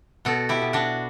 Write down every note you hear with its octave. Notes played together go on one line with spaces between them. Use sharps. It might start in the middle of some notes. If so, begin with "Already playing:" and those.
B2 F#4 A4
E4 G4
B2
D4 F#4